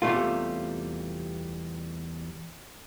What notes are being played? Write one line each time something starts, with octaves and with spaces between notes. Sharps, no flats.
E2 C3 F#3 G3 A3 F4